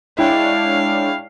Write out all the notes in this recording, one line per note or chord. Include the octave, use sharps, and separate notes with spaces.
G#3 D4 E4 C#5 F5 G5